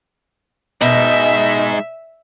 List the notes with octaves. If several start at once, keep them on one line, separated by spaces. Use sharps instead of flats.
B2 G#3 D#4 E5